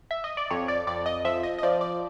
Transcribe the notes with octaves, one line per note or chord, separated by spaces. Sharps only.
E5
D#5
D5
F2 C#5
D5
F2 D5
D#5
F3 E5
D#5
D#5
F3 D5
D5